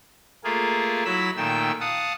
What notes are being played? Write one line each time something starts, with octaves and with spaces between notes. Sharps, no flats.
A3 A#3 F4 G#4
F#3 E4 B5 E6
A#2 D#3 A3 G5 E6
F5 F#5 A5 D#6